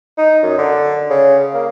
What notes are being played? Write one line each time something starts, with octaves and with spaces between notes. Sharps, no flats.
D#4
F#2
D3
C#3
A#3